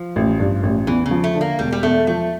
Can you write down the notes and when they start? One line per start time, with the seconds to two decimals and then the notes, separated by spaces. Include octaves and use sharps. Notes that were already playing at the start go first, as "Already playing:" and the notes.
Already playing: F3
0.16 A1
0.40 G2
0.63 A1
0.87 E2 E3
1.06 C#3
1.11 F3
1.24 A3
1.35 D3
1.41 A#3
1.59 E1 G3
1.72 G3
1.83 E2 A3
2.07 F3 A3